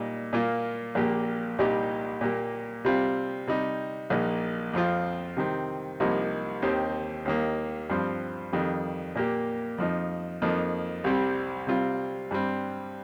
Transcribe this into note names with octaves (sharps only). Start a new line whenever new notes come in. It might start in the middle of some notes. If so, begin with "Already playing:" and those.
Already playing: A#2 G3 D#4
A#2 A#3 F4
A#1 A#2 A#3 G4
C2 A#2 G3 D#4 G4
A#2 A#3 G4
C3 G3 C4 F4
C3 G3 D#4
A#1 A#2 A#3 D#4
F2 F3 C4 F4
C3 D#3 C4
C2 C3 F3 A#3 D#4
D#2 D#3 C4 G4
D#2 D#3 A#3
G2 F3 C4
F2 D#3 G3
A#2 A#3 G4
F2 F3 D#4
F2 F3 A#3 D#4
C2 C3 G3 C4 G4
C3 G3 C4 F4
G2 G3 C4